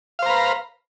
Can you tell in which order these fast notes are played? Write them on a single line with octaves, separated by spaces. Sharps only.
F5 C5 A#5 B4